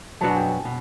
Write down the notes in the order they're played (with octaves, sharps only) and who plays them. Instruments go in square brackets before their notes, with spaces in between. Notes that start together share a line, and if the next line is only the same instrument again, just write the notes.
[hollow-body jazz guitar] B2 F#3 B3 D4 F#4 [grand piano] A5
[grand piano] G#5
G5
G#5
[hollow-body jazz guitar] B2